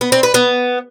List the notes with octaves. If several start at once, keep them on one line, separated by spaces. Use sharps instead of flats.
B3
C4
B4
B3